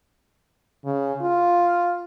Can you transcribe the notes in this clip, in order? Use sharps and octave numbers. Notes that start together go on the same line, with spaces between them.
C#3
F4